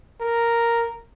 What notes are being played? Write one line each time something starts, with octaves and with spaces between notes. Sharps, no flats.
A#4